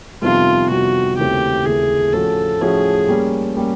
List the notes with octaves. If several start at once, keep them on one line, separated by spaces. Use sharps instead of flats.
F2 C3 D#3 G3 B3 F4
F2 C3 D#3 G3 B3 F#4
D#2 C#3 E3 A3 C4 G4
D#2 C#3 E3 A3 C4 G#4
A2 F3 A3 C#4 F#4 A4
A2 F3 A3 C#4 F#4 G#4
G3 A#3 C#4
G3 A#3 C#4